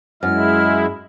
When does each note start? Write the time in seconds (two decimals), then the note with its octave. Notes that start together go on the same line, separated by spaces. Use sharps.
0.23 F#2 G#3 E4 F6